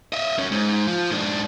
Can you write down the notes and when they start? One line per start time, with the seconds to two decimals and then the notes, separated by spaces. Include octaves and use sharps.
0.13 D#5 E5
0.38 F#2 C#4
0.52 G#2
0.87 F3
1.10 G#2 D4